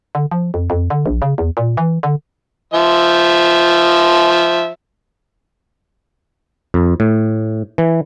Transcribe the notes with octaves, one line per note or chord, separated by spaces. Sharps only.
D3
F3
F2
F2
D3
A#1
C#3
E2
A#2
E3
D3
F3 E5
F2
A2
E3